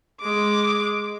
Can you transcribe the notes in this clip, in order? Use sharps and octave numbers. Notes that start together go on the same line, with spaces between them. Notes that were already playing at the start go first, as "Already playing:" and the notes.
G#3 D6